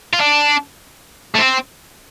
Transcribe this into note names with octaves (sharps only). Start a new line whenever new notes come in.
F4
D4
A3
C4